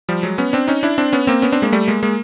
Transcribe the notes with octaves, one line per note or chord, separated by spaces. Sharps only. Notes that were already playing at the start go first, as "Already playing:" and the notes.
F3 G3
F#3 G#3
B3 C#4
C4 D4
C#4 D#4
D4 E4
C4 D4
B3 C#4
A#3 C4
B3 C#4
C4 D4
G#3 A#3
G3 A3
G#3 A#3
G#3 A#3